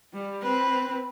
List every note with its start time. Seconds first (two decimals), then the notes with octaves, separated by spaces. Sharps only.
0.14 G3
0.43 C4 B4